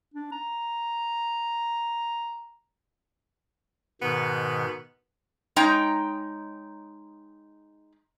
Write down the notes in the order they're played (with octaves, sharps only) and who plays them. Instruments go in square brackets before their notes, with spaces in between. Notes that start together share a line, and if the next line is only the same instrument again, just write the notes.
[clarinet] D4
A#5
[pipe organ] G#2 B2 D#3 [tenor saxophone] B3
[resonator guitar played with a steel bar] G#3 D#4 C#5 G5 A#5